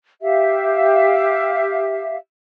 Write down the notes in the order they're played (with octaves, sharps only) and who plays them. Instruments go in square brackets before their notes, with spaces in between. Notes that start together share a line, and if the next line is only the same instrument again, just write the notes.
[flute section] G4 E5 F5